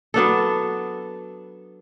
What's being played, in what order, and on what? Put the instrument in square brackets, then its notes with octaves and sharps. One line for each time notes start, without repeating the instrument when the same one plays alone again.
[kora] F#3 B3 D4 A4